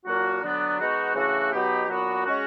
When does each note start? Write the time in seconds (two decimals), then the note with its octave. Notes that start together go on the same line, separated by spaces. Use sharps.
0.05 A#2 F#3 A#3 D4 F#4
0.42 D3 F#3 B3 D4
0.78 B2 G#3 B3 D#4 F#4
1.15 C#3 E3 A3 D4 F#4
1.51 B2 F#3 B3 D#4 G4
1.88 A#2 F#3 B3 D4 F#4
2.25 G#3 C#4 F#4